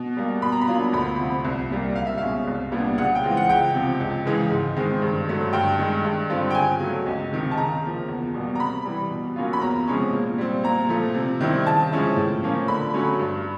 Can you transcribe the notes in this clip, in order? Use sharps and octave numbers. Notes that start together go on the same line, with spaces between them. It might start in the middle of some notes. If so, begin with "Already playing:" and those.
Already playing: B2
G3 A#3
B2 B5
A#5
B5
F#3 A#3 D4 F4
D2 B5
C3 F3
C2
A#2 G3 A#3
C#2 F5
E5
B2 G#3 C#4 F5
C2
A#2 G3 B3 D4
C#3 F#5
G5
E3 G#3 C4 F4
F#5
C#2 G5
C3 F3
C#2
C#3 E3 G#3
G#2
D#3 G#3 C4
G2
D3 F#3 A3
G2 G5
D#3 G#3
G2
D3 G3 C4 F4
G5
C#3 G#5
F#3 A3
C#2
C3 D#3
A5
C#3 A#5
F3 A#3
E2
B2 G3 A#3
A#5
C3 B5
E3 G3
B2
F#3 A#3 C#4 F4
B5
E2 A#5
C3 F3 G#3 C#4
A#2
G3 C4
A#2 A#5
F3 A3
C3
D#3 G3 C4 E4
C#3 A5
F3 G#3 C#4 E4
A2
F3 A#3 C#4
D3 B5
F#3 A3 C#4
G2